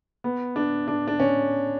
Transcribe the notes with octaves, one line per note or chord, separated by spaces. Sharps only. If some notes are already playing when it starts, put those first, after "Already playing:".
B3
D4
D4
D4
C#4